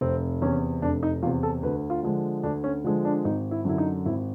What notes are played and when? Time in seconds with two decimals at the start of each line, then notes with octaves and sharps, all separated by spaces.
0.01 F1 C4
0.42 E2 C3 C#4
0.82 F1 D4
1.03 D#4
1.23 E2 C3 F4
1.43 A4
1.63 D2 B4
1.90 F4
2.03 D3 F3 G#3
2.43 D2 D4
2.64 C#4
2.84 D3 F3 G#3 D4
3.05 D4
3.25 G#1 D#4
3.51 E4
3.65 F#2 D3 E4
3.78 D#4
4.06 G#1 E4